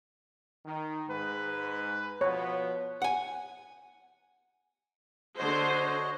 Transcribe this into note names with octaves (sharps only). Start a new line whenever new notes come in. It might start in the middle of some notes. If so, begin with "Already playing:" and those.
D#3
G#2 G#3 B4
B2 F3 B3 C#5
F#5 G#5
D3 F#4 C5 C#5 D#5